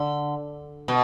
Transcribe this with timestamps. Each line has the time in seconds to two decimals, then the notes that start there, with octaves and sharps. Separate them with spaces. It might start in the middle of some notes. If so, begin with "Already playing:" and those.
Already playing: D3
0.88 B2